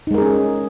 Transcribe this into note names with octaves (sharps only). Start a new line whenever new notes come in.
G#3 C#4 D#4 G#4 A#4